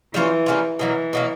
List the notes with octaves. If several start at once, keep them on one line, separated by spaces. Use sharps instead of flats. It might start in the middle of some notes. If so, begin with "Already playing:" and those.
E3 G3 A#3 C#4 F4
G3 A#3 C#4 F4
B2 E3 F#3 A#3
B2 F#3 A#3